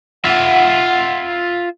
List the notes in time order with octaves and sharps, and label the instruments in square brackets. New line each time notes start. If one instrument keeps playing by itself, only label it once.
[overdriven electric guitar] F4 E5 [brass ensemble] F#5